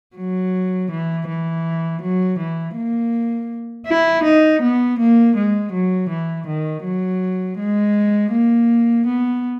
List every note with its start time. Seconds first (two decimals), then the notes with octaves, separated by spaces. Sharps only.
0.16 F#3
0.91 E3
1.28 E3
2.02 F#3
2.39 E3
2.76 A#3
3.87 E4
4.24 D#4
4.62 B3
4.99 A#3
5.36 G#3
5.72 F#3
6.09 E3
6.47 D#3
6.84 F#3
7.58 G#3
8.32 A#3
9.06 B3